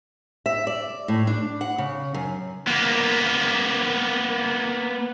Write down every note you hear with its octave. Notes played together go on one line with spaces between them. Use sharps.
E5
D5
A2
D4
F#5
C#3
F#2
A#3 B3